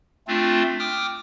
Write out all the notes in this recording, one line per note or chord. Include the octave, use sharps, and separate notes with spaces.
A3 C4 D4 F4
G5 D6 D#6 F6